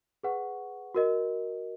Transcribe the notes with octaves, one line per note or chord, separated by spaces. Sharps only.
G#4 B4 F#5 C#6
F#4 A#4 D#5